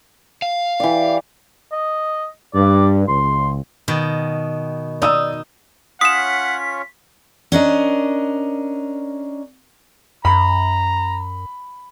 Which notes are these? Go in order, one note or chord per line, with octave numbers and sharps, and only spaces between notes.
F5
E3 G4 D5
D#5
G2 D5
C#2 C6
B2 D#3
D#4 D5 D#6 E6
C#4 F4 C#5 F#5 D#6 B6 E7
C#4 D4 A#4 D#5
F#2 A#5 B5